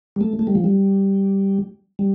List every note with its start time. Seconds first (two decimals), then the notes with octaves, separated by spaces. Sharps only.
0.16 G3
0.21 A3
0.39 A3
0.47 G3
0.55 F3
0.64 G3
1.99 G3